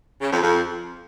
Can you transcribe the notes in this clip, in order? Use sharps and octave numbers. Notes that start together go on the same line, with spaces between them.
C#3
F2
F2